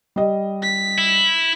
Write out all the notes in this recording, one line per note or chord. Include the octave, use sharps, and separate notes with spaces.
G3 D#5
B6
E4